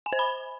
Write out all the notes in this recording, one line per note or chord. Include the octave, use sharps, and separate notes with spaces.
G#5
C5
B5